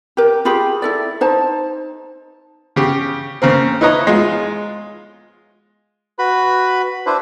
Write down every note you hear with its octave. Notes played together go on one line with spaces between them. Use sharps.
G4 A#4
F4 G4 G#4 B5
E4 A4 D5
D#4 C5 A5
C#3 G4
C#3 A#3 C4
D#4 E4 B4 C#5 D#5 A#5
G#3 F4
F#4 B4 B5
D4 E4 B4 C5